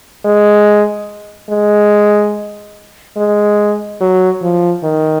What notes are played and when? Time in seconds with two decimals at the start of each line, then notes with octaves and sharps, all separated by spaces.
0.25 G#3
1.50 G#3
3.17 G#3
4.01 F#3
4.42 F3
4.84 D#3